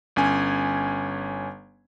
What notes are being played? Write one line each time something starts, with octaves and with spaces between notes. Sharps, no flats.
G1 C#4 G#5